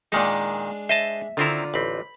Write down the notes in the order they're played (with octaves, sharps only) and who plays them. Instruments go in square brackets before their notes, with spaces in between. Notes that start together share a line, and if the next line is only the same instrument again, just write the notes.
[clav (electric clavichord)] A#2 D#3 D#4 [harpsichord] G#3 D4
[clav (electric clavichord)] C5 D#5 A5 [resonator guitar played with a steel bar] E5
[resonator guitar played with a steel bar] D3 F4 A#5 [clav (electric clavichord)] D#3 C4 E4
[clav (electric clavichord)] A1 C4 [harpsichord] B5